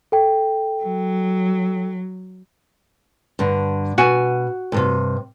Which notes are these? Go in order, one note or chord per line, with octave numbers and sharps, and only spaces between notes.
A4 G5
F#3
G2 D3
B2 F#4 G#5
D2 G2 C3